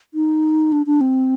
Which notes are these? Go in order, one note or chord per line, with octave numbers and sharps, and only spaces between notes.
D#4
D4
D4
C4